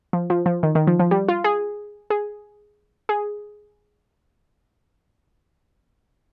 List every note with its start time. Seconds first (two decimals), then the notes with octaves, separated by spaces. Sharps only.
0.13 F3
0.30 F3
0.46 F3
0.63 D#3
0.75 D#3
0.87 F3
0.99 F3
1.11 G3
1.28 F4
1.44 G#4
2.10 G#4
3.09 G#4